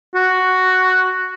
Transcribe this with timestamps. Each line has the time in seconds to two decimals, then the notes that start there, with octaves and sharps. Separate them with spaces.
0.15 F#4